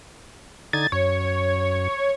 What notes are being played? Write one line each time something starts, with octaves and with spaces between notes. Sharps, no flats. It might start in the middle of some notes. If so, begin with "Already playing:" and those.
D3 D#4 G#6 A6
F#2 C#5